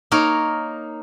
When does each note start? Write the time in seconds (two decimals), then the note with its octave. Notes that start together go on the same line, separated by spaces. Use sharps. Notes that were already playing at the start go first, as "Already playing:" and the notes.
0.12 A#3 D#4 A#4 C#5